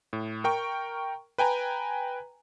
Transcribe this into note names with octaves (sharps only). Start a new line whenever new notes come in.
A2
A#4 G5 C#6
B4 G5 G#5 A#5